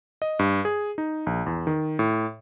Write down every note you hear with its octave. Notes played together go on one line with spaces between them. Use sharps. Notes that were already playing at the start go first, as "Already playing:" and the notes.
D#5
G2
G#4
D#4
A#1
E2
D#3
A2